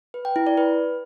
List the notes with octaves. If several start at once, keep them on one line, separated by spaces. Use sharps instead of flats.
B4
G5
E4
D5
B4